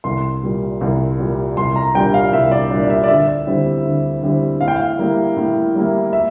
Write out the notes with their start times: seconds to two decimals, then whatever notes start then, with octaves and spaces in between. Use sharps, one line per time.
0.04 C2 C6
0.43 A#2 G3
0.81 C2
1.19 A#2 G3
1.57 C2 C6
1.76 A#5
1.95 A#2 G3 D4 G5
2.14 F5
2.32 C2 E5
2.52 D5
2.70 A#2 G3 D4
2.83 D5
2.90 E5
3.04 D5
3.08 D2 E5
3.47 D3 G3 C4 E4
3.85 D2
4.23 D3 G3 C4 E4
4.60 A2 F5
4.68 G5
4.76 F5
4.99 G3 A#3 E4
5.36 A2
5.75 G3 A#3 E4
6.13 E5